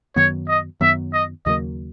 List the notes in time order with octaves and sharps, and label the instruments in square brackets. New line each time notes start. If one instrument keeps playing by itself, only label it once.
[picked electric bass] F#2 D#3 F#3 B3 [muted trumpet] C#5
[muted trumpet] D#5
[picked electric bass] F#2 D#3 F#3 B3 [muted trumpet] E5
[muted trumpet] D#5
[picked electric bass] D#2 C#3 F#3 A#3 [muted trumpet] D#5